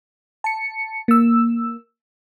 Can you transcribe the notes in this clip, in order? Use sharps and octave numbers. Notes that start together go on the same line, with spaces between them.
A5 C#7
A#3 E6